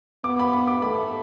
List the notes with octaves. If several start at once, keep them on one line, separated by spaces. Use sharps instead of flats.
B3 D6
B5
B5
D6
A3 B5